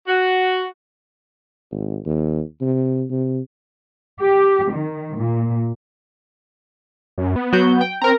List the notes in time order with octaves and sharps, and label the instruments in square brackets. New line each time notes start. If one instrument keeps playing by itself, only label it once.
[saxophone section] F#4
[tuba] G#1
D#2
C3
C3
[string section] G4
D#3
A#2
[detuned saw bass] F#2
B3
[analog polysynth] F#3 F#4 G6
G5
[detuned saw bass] C4 [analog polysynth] A#4 A#5